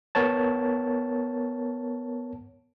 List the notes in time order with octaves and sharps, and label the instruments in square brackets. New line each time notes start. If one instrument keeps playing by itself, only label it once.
[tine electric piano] B3 A#4 C#5 A5